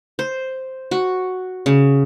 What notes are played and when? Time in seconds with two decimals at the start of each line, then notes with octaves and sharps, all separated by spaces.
0.19 C5
0.91 F#4
1.66 C#3